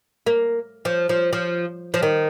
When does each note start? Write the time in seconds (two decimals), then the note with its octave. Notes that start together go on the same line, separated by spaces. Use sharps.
0.26 A#3
0.85 F3
1.09 F3
1.33 F3
1.94 F3
2.03 D#3